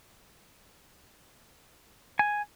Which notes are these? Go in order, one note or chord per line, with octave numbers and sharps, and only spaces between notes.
G#5